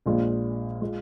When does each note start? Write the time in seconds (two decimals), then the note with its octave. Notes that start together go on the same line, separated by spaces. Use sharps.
0.06 A#1 A#2 G#3 F4
0.81 G#3 F4